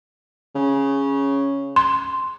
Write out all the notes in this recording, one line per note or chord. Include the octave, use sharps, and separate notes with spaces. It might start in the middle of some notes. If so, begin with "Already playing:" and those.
C#3
C6